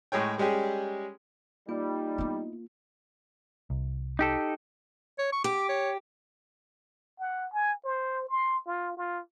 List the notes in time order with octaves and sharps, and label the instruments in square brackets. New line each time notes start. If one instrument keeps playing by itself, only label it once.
[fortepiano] A2 G#3 G#4 C#5 G5
G3 G#3 C#4 G4 G#4
[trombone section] G3 [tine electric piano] A#3 F4 [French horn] D#4
[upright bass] B3 E4
[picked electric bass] C2
[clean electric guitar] D#4 G4 A4
[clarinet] C#5
C#6
[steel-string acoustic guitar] G4 [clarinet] D6
[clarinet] C#5
[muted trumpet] F#5
G#5
C5
C6
F4
F4